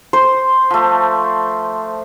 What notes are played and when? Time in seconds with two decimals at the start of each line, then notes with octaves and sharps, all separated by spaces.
0.13 C5
0.70 F3 A3